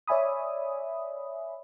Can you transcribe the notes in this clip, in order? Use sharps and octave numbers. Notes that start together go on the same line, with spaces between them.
C#5 D5 E5 G#5 B5 D#6